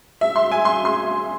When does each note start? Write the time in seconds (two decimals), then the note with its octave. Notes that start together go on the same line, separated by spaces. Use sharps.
0.21 E5
0.36 C6
0.51 G#5
0.65 C6
0.85 C6